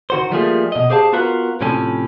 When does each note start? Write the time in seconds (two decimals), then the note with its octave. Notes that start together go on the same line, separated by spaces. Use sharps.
0.10 D#3 F#4 C5
0.31 F3 G3 A3 A#3 F4 G#4
0.72 B2 D#5
0.90 G4 G#4 C5 F5 G#5 A5
1.13 B3 F4 F#4 A#4 B4 F5
1.61 A2 C3 F3 C#4 A4 G#5